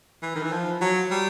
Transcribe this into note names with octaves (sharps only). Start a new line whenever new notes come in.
E3
D#3
E3
F3
F#3
G3